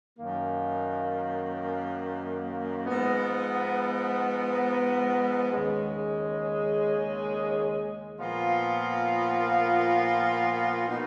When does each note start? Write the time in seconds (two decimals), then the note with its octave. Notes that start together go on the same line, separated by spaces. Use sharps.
0.19 F#2 D#3 A#3
2.86 G#2 F3 B3
5.52 D#2 C#3 G#3
8.19 A#2 F3 B3 F4
10.86 B2 A#3 D#4